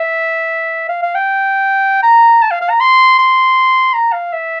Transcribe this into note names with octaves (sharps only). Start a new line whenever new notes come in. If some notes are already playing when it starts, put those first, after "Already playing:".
Already playing: E5
F5
F5
G5
A#5
A5
F5
F5
A#5
C6
C6
A#5
F5
E5